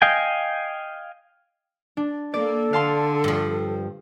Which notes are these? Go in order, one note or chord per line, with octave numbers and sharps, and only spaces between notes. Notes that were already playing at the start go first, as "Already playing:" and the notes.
D#5 F5 G5 G#5
D4
A#3 A4 D5
D3 F5 A5 C6
G2 F3